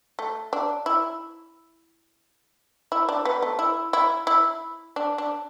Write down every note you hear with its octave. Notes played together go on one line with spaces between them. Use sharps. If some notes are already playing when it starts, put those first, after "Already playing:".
A3
D4
E4
E4
D4
B3
A3
E4
E4
E4
D4
D4